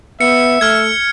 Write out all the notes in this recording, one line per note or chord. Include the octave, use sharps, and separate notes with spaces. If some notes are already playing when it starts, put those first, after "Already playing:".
B3 E5 C#7
A3 F6 G#6